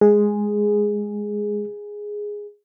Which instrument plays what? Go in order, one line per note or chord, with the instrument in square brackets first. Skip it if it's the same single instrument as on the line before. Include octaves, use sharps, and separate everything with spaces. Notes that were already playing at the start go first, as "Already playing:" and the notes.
[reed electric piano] G#3 [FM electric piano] G#4